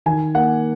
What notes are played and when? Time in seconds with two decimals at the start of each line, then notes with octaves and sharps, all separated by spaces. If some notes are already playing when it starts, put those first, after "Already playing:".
0.06 D#3 G#5
0.35 A#3 F#5